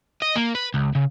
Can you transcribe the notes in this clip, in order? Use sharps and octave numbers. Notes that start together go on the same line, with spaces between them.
D#5
A#3
B4
C#2
C#3